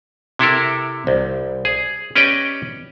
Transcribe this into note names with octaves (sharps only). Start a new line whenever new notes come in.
C3 E4 A4 A#4
C2
G#4
C#4 G4 B4 D5 D#5 G5